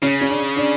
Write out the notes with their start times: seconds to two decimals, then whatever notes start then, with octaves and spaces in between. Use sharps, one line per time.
0.02 C#3 C#4
0.21 C#4
0.29 D4
0.56 D4